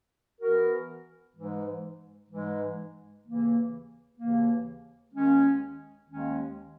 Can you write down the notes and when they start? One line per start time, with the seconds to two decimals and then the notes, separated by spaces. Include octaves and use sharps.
0.41 E3 B3 F#4 A#4
1.35 G#2 E3 G#3
2.29 G#2 E3 G#3
3.24 D#2 C#3 E3 A#3
4.18 D#2 C#3 E3 A#3
5.12 D#2 D#3 G#3 C#4
6.07 D#2 D#3 G#3 C#4